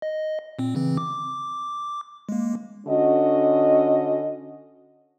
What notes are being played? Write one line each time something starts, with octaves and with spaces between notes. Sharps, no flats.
D#5
A#2 C4
C#3 E3 C4
D6
G#3 A#3
D3 C#4 F#4 D#5